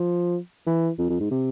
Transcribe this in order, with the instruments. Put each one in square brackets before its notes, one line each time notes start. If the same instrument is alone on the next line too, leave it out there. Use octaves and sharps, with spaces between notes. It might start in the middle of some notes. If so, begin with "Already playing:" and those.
Already playing: [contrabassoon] F3
E3
F2
F2
G#2
C3